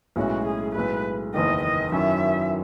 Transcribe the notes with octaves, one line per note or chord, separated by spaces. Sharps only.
B1 A2 G#3 C#4 E4 F#4
G#4
B1 A2 G#3 B4
F#1 E2 D#3 D#5
D#5
F#2 D#3 F#3 C#4 E4 E5